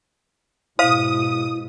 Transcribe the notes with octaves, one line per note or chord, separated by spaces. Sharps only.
G#2 B2 E4 C5 F5 D#6